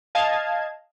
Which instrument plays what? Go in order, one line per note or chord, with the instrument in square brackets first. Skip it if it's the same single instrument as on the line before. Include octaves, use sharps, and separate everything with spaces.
[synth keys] D#5 F5 A5 G#6